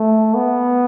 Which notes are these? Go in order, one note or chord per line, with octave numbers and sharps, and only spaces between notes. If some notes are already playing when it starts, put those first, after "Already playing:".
Already playing: A3
B3